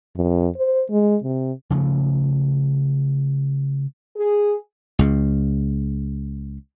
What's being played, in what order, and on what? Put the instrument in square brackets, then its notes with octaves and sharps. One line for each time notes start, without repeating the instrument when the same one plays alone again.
[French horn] F2
C5
G#3
C3
[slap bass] C#3 F3 A3
[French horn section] G#4
[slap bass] C#2 C#3